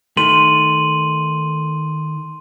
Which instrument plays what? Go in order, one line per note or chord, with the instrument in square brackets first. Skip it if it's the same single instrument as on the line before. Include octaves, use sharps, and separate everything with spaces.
[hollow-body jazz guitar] D#3 A3 [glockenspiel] C6 D#7 F#7